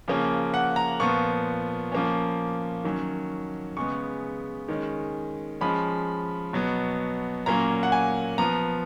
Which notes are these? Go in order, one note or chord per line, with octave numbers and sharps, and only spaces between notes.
C#3 F3 A#3 C#4
F#5
A#5
A#2 F3 B3 C#6
F3 A#3 C#4
D#3 F#3 C#4
C#3 G#3 B3 C#6
D#3 G#3 C#4
F3 G#3 C#4 B5
B2 F#3 B3
A#2 F#3 A#3 C#4 A#5
F#5
G#5
F3 B3 A#5